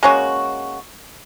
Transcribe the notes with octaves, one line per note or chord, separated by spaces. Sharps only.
G#3 A#3 C#4 F#4